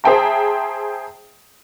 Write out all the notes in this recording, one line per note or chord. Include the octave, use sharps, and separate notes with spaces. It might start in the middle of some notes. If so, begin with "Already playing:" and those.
G#4 C5 E5 G5 A5 A#5